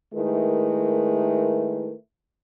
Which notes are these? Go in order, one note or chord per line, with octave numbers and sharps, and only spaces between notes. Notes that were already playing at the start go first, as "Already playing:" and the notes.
D#3 G#3 A3 E4 A#4 B4